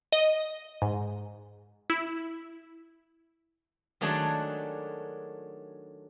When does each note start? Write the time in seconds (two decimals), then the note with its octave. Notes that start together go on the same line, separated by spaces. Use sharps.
0.12 D#5
0.82 G#2
1.90 E4
4.01 D#3 F#3 A3 D4 G#4 A5